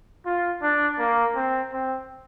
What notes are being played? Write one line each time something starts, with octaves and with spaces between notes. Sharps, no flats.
F4
D4
A#3
C4
C4